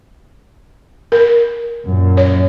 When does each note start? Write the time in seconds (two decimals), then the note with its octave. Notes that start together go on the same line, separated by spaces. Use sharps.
1.12 A#4
1.86 F#2 A#2
2.17 C#5